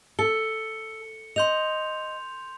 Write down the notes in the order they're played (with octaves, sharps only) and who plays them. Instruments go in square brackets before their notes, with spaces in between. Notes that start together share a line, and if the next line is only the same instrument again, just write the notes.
[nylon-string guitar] A4 [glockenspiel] C#7 G7
[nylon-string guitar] D#5 [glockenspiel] C6 G6 F7